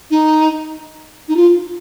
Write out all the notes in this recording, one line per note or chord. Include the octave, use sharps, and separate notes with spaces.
D#4
D#4
F4